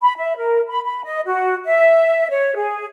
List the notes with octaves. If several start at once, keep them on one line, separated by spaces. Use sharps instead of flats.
B5
E5
A#4
B5
B5
D#5
F#4
E5
C#5
G#4